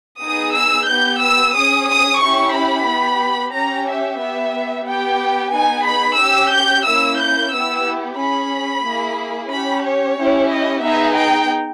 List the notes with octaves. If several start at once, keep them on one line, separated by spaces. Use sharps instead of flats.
B3 D#4 G#4 D#6
E6
B3 G4 G6
E6
C#4 G#4 D#6
D#6
C#4 E4 G4 C#6
B5
B3 G4
C#4 G4 A#5
E5
B3 G4 E5
B3 G4 G5
B3 D#4 G#4 G#5
B5
C#4 G4 E6
G6
A#3 C#4 E4 E6
G6
B3 E4 G4 E6
C#4 G#4 B5
A#3 E4 G#4
C#4 G4 B5
C#5
C#4 E4 G4
D#5
B3 D#4 G#4 E5
G5